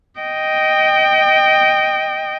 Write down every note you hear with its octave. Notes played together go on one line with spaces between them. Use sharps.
D#5 G5